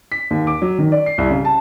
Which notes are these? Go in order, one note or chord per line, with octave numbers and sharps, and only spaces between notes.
B6
D#2
D6
F#3
D#3
D5
C7
C2
C#3
A5